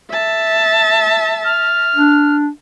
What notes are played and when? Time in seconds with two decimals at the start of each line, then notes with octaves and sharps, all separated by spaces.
0.10 E5 A5
1.45 F6
1.96 D4